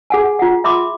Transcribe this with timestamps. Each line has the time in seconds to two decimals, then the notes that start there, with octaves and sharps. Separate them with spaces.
0.10 G#4 F#5 G#5
0.39 F4 F#5
0.64 E5 B5 C6 D6